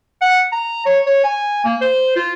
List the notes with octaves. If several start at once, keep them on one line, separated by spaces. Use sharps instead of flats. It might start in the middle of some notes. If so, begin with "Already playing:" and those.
F#5
A#5
C#5
C#5
G#5
A#3
C5
F4